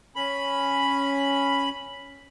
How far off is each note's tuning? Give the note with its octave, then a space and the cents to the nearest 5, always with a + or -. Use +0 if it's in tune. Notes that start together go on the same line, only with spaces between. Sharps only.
C#4 +0 B5 +0